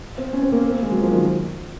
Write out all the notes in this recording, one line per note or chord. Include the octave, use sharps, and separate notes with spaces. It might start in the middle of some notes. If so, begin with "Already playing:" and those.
C4
C#4
C4
A#3
C4
A#3
G#3
F#3
F3
D#3